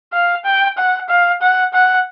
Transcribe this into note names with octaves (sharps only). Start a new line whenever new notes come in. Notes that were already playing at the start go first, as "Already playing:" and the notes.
F5
G5
F#5
F5
F#5
F#5